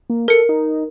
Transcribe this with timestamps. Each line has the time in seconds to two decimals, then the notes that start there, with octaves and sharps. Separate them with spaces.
0.10 A#3
0.28 A4 A#4 C#7
0.49 D#4